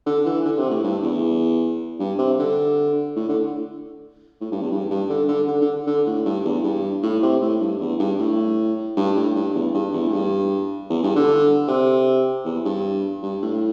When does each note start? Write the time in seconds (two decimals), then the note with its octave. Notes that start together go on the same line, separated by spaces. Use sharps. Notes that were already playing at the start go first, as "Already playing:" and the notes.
0.06 D3
0.26 E3
0.45 D3
0.57 C3
0.70 A2
0.83 G2
1.03 E2
1.99 G2
2.19 C3
2.39 D3
3.16 A2
3.29 D3
4.41 A2
4.52 G2
4.61 E2
4.71 G2
4.91 G2
5.09 D3
5.28 D3
5.48 D3
5.61 D3
5.87 D3
6.06 A2
6.25 G2
6.45 E2
6.64 G2
7.02 A2
7.22 C3
7.42 A2
7.61 G2
7.81 E2
7.99 G2
8.19 A2
8.97 G2
9.15 A2
9.36 G2
9.54 E2
9.74 G2
9.93 E2
10.07 A2
10.13 G2
10.90 E2
11.03 G2
11.16 D3
11.68 C3
12.45 E2
12.65 G2
13.22 G2
13.42 A2